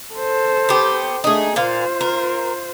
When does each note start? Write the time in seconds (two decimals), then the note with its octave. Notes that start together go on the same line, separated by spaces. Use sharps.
0.14 A4 C5
0.69 B3 G4
1.24 A3 D4 D#4 G#4
1.56 A#2 F4 C5 F5
2.01 A#4